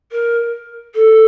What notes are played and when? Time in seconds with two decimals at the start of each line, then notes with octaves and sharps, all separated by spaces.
0.12 A#4
0.95 A4